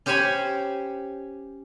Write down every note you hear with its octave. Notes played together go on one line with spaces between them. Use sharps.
C#4 G4 C5 C#5 G#5 B5